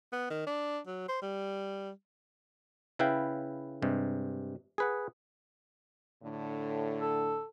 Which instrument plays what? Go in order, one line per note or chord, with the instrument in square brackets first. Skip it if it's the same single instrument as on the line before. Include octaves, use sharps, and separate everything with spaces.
[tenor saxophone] B3
D#3
D4
F#3
C5
G3
[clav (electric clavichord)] C#3 E4 B4 F5 G5
G2 C3 G#3
G#4 B4 F#5
[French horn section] A2 D3
[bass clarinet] A4